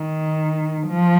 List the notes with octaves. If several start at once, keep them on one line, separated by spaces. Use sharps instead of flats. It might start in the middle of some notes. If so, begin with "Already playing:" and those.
Already playing: D#3
F3